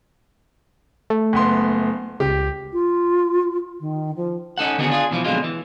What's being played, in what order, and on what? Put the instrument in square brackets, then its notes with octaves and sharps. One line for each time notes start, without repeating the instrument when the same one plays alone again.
[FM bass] A3
[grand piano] F#1 B3 C6
[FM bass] C#2 [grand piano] G4
[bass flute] F4
D#3
F3
[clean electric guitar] C#4 D#4 A4 F#5
D3 D#3 B3 C#4 F#4 G#4
D4 F4 G#4
B2 E3 F3
F2 B2 D3 F#3 G#3 F4
E3